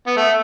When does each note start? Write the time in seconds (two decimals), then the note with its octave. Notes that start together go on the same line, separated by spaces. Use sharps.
0.07 B3
0.17 A3